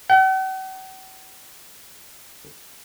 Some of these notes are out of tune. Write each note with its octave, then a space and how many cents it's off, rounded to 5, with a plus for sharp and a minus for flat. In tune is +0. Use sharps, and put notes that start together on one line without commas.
F#5 +45